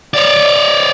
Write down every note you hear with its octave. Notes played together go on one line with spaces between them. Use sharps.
C#5 D5